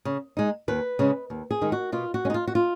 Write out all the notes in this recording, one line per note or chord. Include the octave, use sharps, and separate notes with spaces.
C#3
G#3 D#4
D#2 B4
C#3 G#3 C#4
D#2
G#4
D#3 G#3 D#4
F#4
B2 F4
F#4
G#3 C#4
D#4
F4
F#4
F4